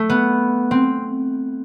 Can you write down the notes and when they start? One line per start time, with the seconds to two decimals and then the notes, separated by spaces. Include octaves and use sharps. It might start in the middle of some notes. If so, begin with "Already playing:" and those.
Already playing: A3
0.10 B3
0.71 C4